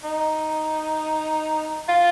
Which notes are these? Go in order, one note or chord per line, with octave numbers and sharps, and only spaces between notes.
D#4
F4